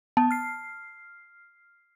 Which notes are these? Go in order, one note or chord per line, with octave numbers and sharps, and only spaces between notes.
B3 A5
F6 C7